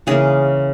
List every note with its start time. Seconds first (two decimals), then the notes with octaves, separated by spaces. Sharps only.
0.07 C#3 E3 A#3 G#4